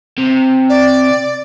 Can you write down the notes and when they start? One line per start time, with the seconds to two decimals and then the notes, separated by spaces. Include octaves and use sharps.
0.18 C3
0.69 D5